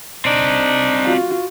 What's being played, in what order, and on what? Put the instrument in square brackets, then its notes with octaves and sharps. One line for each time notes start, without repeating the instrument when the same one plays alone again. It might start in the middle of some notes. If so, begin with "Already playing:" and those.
[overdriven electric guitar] C4 D5 [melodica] D4 D#4
[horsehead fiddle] F4 F#4